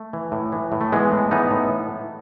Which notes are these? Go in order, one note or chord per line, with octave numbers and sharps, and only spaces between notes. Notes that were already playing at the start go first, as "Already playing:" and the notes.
Already playing: A3
E3
A2
E3
A2
A3
E3 G#3 B3
A2
E3 B3 D#4
A2